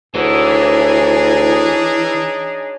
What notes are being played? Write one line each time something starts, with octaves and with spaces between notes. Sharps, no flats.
D2 E3 D4 D#4 F#4 G#4 C#5